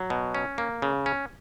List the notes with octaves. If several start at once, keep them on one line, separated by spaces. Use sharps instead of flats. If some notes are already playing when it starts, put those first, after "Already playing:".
Already playing: F#3
B2
C#4
A#3
C#3
C#4